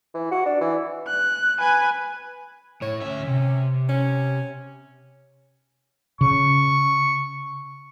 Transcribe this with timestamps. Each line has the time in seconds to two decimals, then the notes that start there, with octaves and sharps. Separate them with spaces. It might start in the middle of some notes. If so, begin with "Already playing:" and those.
0.15 E3
0.31 F#4
0.46 D4
0.61 E3
1.07 F#6
1.60 B4 G#5
2.82 A2 C#5
3.01 D2 C#4 E5
3.27 C3
3.89 C#4
6.21 C#3 C#6